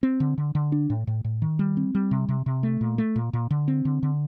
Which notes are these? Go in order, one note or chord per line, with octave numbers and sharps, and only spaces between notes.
C4
D3
D3
D3
D4
A2
A2
A2
D#3
G3
C4
G3
C3
C3
C3
A3
A#2
A3
A#2
A#2
D3
C4
D3
D3